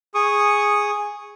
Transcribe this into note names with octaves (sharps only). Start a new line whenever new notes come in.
G#4 C#6 D#6